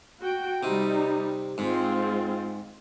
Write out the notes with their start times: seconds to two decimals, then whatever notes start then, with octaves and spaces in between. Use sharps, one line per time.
0.21 F#4 G5
0.63 C3 G3 D#4
1.58 G#2 G#3 C4 F4